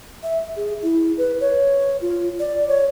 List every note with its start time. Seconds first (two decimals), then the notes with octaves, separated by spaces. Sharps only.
0.23 E5
0.56 G#4
0.83 E4
1.18 B4
1.40 C#5
2.01 F4
2.40 D5
2.68 C#5